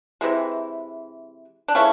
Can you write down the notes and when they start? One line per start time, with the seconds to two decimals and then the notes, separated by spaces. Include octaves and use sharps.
0.21 C3 E3 G#3
1.68 D4
1.75 C#3 E3 A3 C#4